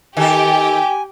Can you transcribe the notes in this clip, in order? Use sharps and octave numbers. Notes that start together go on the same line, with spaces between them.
D#3 G4 A4 G5 G#5